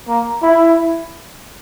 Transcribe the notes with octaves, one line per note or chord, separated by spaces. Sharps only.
A#3
E4